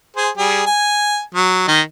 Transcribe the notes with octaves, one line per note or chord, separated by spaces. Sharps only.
G#4 C5
G3 G#4
G#5
F#3
D#3 D#5